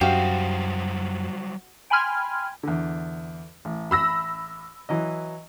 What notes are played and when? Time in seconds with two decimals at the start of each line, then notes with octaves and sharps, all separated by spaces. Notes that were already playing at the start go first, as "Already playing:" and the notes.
0.01 F#2 F#3 G3 F#4 G4 C5 F5
1.90 G5 G#5 B5 C6 F6 G#6
2.63 E2 D3
3.65 A1
3.91 B5 E6 A#6
4.89 E3 F#3 D#5